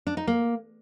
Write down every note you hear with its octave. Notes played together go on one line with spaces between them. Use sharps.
D4
D#4
A#3